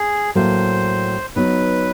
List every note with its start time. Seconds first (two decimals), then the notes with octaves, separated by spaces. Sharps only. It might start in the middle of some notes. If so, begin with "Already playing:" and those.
Already playing: G#4
0.35 A2 F#3 A#3 C5
1.36 F#3 B3 D#4 B4